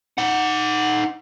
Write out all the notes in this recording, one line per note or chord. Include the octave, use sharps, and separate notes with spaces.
D#4 F#5